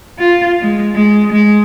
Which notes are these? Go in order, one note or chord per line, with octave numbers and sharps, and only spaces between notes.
F4
G#3
G#3
G#3